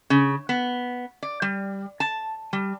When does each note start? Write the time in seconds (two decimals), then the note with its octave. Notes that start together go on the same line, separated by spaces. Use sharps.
0.10 C#3
0.49 B3
1.23 D5
1.42 G3
2.00 A5
2.53 G3